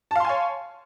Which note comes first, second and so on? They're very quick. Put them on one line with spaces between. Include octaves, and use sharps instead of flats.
A5 F5 C6 G#5 C#5